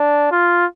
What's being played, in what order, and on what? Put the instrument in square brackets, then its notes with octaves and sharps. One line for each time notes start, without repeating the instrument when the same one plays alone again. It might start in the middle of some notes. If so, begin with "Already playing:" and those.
Already playing: [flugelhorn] D4
F4